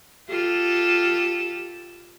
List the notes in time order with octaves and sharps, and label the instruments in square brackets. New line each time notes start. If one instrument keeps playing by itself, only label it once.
[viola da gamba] F4 G4 A4